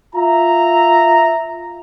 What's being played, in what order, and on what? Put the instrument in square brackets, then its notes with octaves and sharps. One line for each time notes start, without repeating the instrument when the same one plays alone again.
[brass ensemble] F4 E5 A#5